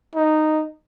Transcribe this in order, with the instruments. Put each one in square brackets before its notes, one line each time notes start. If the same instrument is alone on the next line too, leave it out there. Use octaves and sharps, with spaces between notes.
[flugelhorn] D#4